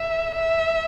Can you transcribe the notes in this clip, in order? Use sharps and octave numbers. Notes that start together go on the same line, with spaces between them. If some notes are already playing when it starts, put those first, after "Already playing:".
Already playing: E5
E5